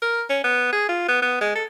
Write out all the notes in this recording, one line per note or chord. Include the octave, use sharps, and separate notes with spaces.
A#4
C#4
B3
G#4
F4
B3
B3
G#3
A4